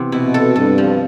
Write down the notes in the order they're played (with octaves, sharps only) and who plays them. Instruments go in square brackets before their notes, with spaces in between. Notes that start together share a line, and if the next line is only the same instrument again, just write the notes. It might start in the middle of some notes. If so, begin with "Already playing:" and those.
Already playing: [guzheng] C3 E3 B3
[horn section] B2 [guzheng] E4
[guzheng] A4
[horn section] G2 [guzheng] A4
[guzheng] F3